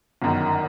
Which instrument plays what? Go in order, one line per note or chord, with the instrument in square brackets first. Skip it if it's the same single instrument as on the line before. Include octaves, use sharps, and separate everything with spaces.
[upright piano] G1 F#2 D#3